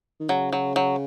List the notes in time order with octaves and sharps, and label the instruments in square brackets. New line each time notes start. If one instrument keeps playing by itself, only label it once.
[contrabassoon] D#3
[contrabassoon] C#3 [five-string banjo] F#3
[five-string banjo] F#3
F#3